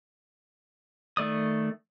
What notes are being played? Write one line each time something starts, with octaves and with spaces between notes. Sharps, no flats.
D#3 A3 D5 D#6